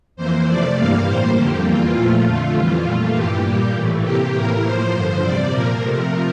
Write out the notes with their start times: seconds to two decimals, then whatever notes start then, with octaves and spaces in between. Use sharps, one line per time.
0.16 F2 E3 A#3 C5
0.46 C3 F3 A3 D5
0.76 G2 E3 G3 A#3 F5
1.06 A2 G3 A#3 C5
1.36 F2 D3 G3 A#3 G4
1.65 E2 E3 A#3 F4
1.95 A#2 F3 A3
2.24 F2 D3 A3 F4
2.55 F2 E3 G3
2.84 A#2 A3
3.14 G2 E3 A#3 G4
3.43 A#2 G3 A#3 G4
3.74 A2 E3 A3
4.03 C3 E3 A#3 G4
4.33 A2 E3 A#3 A#4
4.63 A2 F3 A#3 C5
4.93 G2 D3 F3
5.22 E2 C3 G3 D5
5.52 A#2 F3 A#3 A#4
5.82 C3 F3 A3 A#4